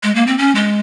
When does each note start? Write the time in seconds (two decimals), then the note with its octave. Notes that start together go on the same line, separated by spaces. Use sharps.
0.03 G#3
0.15 A#3
0.27 C4
0.38 C#4
0.55 G#3